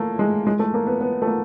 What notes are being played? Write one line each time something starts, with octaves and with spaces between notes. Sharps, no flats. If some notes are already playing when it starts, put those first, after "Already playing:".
Already playing: A3 A#3
G#3
G#3
A3
A#3
B3
B3
A3
A#3